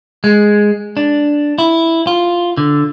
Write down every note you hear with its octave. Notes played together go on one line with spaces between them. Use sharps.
G#3
D4
E4
F4
D3